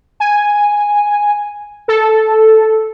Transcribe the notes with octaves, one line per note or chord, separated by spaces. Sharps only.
G#5
A4